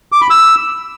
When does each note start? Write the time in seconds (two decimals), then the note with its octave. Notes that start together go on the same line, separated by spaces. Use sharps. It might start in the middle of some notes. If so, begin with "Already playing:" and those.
0.12 D6
0.21 B5
0.30 E6